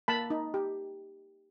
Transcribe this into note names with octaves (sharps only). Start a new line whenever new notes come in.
A#3 A5 B5
D#4
G4